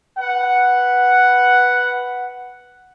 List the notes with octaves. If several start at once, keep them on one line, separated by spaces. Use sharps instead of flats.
B4 F#5